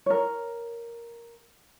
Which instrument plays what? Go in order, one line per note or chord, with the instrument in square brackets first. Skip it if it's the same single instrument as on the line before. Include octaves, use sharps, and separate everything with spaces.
[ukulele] A#4 C#5